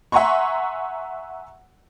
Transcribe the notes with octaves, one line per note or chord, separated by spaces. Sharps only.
E5 F#5 G#5 A#5 C6 C#6